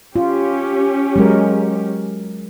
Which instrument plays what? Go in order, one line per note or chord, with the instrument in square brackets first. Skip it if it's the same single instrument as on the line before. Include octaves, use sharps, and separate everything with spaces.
[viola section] C#4 G4 [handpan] F4
[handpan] F#3 G#3 A#4